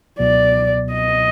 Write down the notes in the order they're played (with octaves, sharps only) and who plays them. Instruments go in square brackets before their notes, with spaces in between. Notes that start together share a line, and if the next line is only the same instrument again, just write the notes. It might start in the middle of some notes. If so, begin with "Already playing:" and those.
[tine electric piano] C#2 B2 F#3 B3 [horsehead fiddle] D5
[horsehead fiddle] D#5